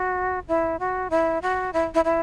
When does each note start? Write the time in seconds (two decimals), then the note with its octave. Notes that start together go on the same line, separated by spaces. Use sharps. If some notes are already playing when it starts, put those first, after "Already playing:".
Already playing: F#4
0.48 E4
0.80 F#4
1.10 E4
1.42 F#4
1.73 E4
1.95 E4
2.05 E4